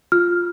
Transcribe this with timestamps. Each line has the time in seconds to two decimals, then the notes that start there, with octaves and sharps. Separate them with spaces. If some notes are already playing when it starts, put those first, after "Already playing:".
0.12 F4 F6